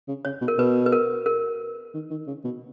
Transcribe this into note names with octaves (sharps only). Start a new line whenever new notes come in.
C#3
C#3 C#5
B2
A#4
B2 B4
B4
A#4
A#4
D#3
D#3
C#3
B2